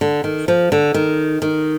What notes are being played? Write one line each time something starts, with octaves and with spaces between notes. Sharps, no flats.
D3
D#3
F3
D3
D#3
D#3